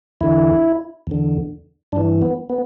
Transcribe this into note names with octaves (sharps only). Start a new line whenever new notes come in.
E2 D3 E4
E2 D3
G2 E3 D4
B3
B3